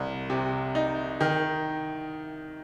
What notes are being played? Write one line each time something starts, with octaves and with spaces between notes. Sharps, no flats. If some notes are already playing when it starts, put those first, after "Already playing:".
Already playing: C2 G3
C3
D#4
D#3